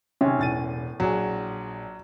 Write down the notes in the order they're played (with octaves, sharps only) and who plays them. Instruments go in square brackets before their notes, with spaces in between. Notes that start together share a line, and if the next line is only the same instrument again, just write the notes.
[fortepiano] C3 D#3 [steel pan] C#4
[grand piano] E1 A6 D#7 [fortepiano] A2
[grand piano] A#1 G#4 [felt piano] F#3